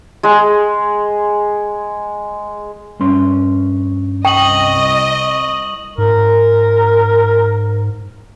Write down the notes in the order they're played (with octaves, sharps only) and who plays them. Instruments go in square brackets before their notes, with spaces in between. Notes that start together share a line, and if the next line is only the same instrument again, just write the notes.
[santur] G#3 G#4
[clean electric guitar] G2 C#4 C6
[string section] C2 D#5 [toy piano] G5 [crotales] C#6 D#6 F#7
[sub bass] G#2 [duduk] A#4